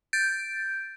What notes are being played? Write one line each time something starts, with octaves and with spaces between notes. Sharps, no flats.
G6 A6 D7